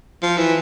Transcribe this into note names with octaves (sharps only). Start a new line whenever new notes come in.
F3
E3